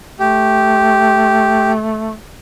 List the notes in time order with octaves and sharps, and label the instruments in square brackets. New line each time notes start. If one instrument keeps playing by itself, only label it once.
[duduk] A3 [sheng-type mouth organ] G4